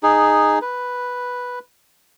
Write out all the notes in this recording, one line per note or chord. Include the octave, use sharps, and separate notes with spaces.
D#4 G#4
B4